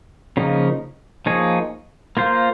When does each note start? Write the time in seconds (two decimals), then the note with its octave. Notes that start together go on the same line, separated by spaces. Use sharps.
0.37 C#3 F3 A#3 D#4
1.26 F3 A#3 D#4 G#4 C#5
2.17 A#3 F4 C5